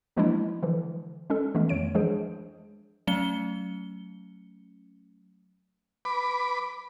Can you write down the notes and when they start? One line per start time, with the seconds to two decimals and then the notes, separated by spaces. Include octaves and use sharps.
0.16 E3 F3 G#3 A#3 D4 E4
0.62 D3 E3 F3
1.30 G#3 C#4 A4
1.55 E3 G#3 A3 B3 C#4
1.69 F2 D#3 C#5 D7
1.95 E3 F3 G#3 D4 G#4 C5
3.07 F#3 A3 C#4 C#7 G7
6.05 B4 B5 D6